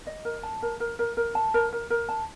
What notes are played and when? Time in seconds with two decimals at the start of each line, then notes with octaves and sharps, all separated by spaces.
0.07 D#5
0.25 A#4
0.43 A5
0.62 A#4
0.80 A#4
0.99 A#4
1.17 A#4
1.35 A5
1.54 A#4
1.73 A#4
1.90 A#4
2.09 A5